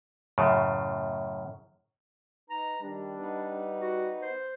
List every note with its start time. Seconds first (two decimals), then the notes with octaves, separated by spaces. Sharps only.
0.38 F#2 A2 C#3
2.50 D#4 B4 A#5
2.82 D#3 G3 D4
3.19 B3 D#4 B4
3.80 F#4
4.22 C5